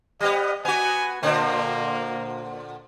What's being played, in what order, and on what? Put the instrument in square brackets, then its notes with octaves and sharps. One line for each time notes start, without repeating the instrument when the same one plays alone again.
[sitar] G3 B3 [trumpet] D#5
[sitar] B3 F#4 [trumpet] G#5
[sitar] A#2 D3 C4 [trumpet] A#3